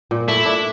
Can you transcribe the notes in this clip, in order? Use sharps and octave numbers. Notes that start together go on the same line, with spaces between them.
A#2
A3 E4
D4